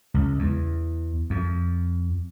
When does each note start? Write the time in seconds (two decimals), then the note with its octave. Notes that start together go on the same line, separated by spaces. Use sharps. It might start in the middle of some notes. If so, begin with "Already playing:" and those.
0.14 C#2
0.39 E2
1.30 F2